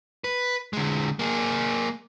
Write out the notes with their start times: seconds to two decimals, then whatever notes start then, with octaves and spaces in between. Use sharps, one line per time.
0.24 B4
0.73 D3 G#3
1.19 A#3 G#4